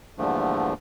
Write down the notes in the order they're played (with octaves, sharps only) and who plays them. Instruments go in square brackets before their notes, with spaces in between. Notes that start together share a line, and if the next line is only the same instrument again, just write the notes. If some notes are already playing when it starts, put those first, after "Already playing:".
[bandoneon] E2 G2 A#2 D3 F3 A3